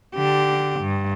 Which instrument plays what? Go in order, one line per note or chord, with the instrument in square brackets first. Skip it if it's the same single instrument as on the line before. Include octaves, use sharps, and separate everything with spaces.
[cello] D3 G4
G2